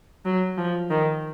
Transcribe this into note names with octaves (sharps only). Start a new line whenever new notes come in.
F#3
F3
D#3